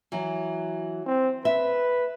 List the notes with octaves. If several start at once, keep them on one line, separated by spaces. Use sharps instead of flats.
E3 F#3
C4
B4 E5